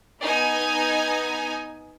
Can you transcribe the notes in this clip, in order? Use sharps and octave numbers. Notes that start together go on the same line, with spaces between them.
B3 D#4 G#5